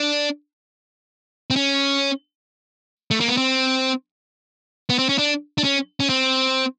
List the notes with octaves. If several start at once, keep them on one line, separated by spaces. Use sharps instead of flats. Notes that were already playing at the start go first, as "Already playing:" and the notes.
Already playing: D4
C4
C#4
A3
A#3
B3
C4
B3
C4
C#4
D4
D4
C#4
C#4
C4